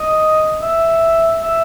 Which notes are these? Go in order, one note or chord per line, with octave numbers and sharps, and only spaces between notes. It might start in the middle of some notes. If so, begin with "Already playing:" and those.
Already playing: D#5
E5
E5